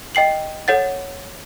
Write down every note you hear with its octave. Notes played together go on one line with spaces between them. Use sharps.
D#5 G5 C7 F#7
A4 C#5 F#5 A6